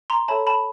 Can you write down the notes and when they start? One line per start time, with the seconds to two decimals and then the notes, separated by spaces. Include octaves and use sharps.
0.10 A#5 C6
0.28 A4 C#5 E5 A5 B5
0.47 A5 B5